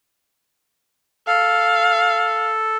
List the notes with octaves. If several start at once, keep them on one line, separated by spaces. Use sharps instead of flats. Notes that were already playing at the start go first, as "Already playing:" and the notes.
A4 F5